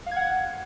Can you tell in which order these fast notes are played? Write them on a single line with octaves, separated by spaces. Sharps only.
F5 G#6 F#5